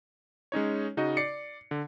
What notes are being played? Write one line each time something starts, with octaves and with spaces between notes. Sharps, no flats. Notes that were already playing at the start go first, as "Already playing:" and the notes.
G#3 C#4 D#4 C#5
C#3 D#4 F#4 D#5
D5 C7 C#7
D3